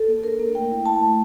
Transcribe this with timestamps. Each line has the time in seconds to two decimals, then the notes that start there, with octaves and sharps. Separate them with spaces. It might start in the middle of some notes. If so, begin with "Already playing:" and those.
Already playing: A4
0.08 A#3
0.24 D4 A#4
0.39 A#3
0.55 A3 G5
0.70 E4
0.86 E4 A5
1.01 A3